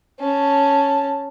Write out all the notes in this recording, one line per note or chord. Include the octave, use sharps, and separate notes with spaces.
C#4 A5